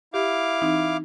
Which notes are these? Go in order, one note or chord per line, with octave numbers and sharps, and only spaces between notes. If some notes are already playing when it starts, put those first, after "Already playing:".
E4 G4 F5 D6
E3 C4 D#4